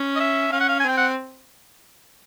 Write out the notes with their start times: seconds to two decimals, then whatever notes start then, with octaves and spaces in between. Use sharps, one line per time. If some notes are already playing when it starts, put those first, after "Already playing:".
Already playing: C#4
0.16 D#5
0.20 E5
0.52 C#4 F5
0.60 F#5
0.69 F5
0.80 G#5
0.84 C4 G5
0.98 F#5